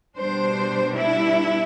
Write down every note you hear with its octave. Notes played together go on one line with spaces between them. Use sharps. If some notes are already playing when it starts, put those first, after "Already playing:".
B2 G3 D4 C5
E4